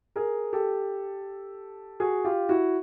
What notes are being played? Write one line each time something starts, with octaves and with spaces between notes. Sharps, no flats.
G#4 A#4
G4 A4
F#4 G#4
F4 G4
E4 F#4